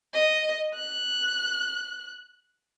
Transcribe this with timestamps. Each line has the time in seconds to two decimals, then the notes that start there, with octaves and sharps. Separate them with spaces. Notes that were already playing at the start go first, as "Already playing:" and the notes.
0.14 D#5
0.75 F#6